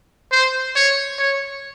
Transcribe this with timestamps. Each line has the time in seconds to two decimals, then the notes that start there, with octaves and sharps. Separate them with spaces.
0.32 C5
0.76 C#5
1.19 C#5